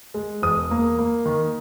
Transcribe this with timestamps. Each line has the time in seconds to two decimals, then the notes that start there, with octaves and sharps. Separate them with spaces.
0.14 G#3
0.42 E1 D#6
0.71 A#3
0.99 A#3
1.25 D#3